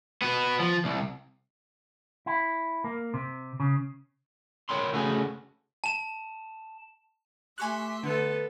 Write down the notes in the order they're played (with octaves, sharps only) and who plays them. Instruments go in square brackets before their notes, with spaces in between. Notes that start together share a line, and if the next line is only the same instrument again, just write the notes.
[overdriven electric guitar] B3 F#4
F3
C2
[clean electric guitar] E4
A#3
C3
C#3
A#4 C#5 G5 B5 C6
C#3 A3 C#4 F#4 G#4 B4
[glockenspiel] A5 E7
[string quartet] A3 E5 C6 [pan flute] G4 [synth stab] G#5 C#6 F#6
[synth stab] D3 [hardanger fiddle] B3 A4 [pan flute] B4